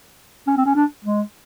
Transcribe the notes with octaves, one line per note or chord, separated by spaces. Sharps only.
C#4
C4
C#4
D4
G#3